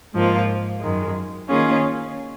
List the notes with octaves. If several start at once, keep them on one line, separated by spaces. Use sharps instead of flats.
G#2 F3 A#3 F4
F#2 D#3 G#3
D#3 A#3 C#4 F4 G#4